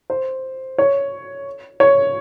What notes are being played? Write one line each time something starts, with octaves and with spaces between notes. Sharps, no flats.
C5
C#5
C#5